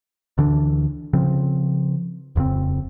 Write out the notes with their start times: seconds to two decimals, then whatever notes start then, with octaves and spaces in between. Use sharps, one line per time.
0.38 D2 D3 E3 D4
1.13 C#3 F3 C4
2.36 D#1 F2 C#3 C4